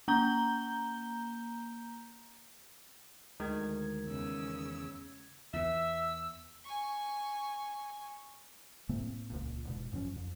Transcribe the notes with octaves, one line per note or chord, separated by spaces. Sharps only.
A#3 A#5 G6 G7
D2 D#3 G#3 A3 G#6
E2 C#3 E6
E2 E3 E5 E6
G#5 C#6
A2 A3 A#3 C4
D#1 C#2 A#2
E1 G#2 B2
G1 F#2 F3 C#4
F2